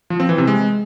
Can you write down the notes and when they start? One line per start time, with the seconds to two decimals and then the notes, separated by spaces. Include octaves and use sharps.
0.10 F3
0.20 C4
0.29 E3
0.38 C3
0.47 G#3